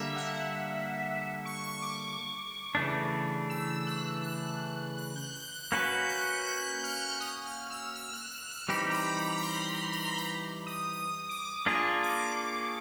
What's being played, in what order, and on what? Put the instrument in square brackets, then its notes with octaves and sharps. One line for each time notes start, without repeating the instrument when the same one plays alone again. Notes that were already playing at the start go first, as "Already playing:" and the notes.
Already playing: [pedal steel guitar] D3 G3 A#3 [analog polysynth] E5
[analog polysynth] F#5
C#6
C#6
D6
[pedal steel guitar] C#3 E3 A3 D4
[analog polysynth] E6
F#6
F#6
F#6
G6
F#6
F#6
[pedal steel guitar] A#3 C#4 F#4 B4 [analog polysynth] G6
[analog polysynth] F#6
G6
F6
D#6
F6
E6
F6
F#6
F#6
F6
[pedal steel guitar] E3 G3 C4 D#4 G4 [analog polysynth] B5
[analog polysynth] A#5
B5
A#5
B5
C6
C6
B5
A#5
D#6
D#6
D6
[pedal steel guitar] A#3 D4 F4 G#4 [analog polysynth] C#6
[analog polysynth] D6